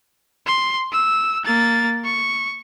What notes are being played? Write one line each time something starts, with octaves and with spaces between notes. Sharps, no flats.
C6
E6
A#3 A6
C#6